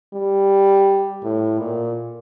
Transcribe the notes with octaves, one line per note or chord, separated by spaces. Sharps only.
G3
A2
A#2